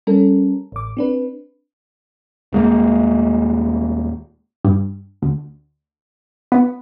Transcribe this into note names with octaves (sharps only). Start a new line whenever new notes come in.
G3 C#4 A4 A#4
A1 D6
C4 D4 B4
D#1 G#3 A#3
G2
D2
B3